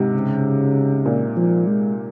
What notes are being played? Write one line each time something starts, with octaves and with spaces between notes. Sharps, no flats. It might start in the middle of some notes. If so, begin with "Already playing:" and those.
Already playing: G#2 C3
C#3
A#2
F3
G#3